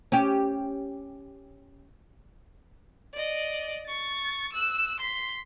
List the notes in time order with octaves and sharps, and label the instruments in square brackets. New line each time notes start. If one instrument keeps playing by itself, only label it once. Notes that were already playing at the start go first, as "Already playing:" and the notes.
[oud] C#4 G4
[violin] D5 D#5
C#6 A6
E6 F#6
C6 B6